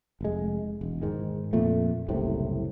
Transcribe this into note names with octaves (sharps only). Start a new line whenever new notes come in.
F1 G#3
E1
G#2 D#3 G#3
F2 A#2 A3
F#1 C2 A2 C3